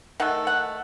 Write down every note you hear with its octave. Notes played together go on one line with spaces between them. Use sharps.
D#3 A3 F#5
F#5